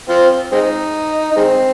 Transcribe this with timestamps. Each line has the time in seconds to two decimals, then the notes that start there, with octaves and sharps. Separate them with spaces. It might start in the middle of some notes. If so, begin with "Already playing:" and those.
0.09 C4 F4
0.52 G#3 C4 D#4
1.32 D#4
1.36 D#3 G#3 C4